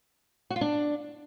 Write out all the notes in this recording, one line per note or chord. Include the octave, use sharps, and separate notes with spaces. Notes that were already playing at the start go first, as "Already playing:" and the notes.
F#4
F4
D4